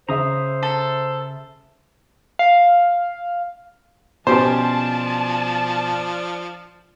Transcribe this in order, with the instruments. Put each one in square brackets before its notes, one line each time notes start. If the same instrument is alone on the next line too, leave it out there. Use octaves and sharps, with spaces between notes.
[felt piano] C#3 E5 [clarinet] C5 [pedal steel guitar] A#5 D#6
[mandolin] A4
[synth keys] F5
[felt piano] B2 C#4 [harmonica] F3 D4 [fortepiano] G4 C5 [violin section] A5